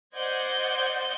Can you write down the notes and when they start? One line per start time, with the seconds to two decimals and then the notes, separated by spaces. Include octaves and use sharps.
0.16 C5 D5 D#5 F#5 G6 G#6